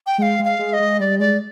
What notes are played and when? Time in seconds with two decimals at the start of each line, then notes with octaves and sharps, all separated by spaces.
0.06 G5
0.18 G#3 G5
0.22 F5
0.39 G#3
0.45 F5
0.59 G#3
0.73 D#5
0.79 G#3
1.00 G3 D5
1.20 G#3 D5